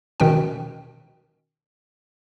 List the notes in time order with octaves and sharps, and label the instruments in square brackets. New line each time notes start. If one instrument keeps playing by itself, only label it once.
[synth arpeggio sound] B2 D#3 C#4 G5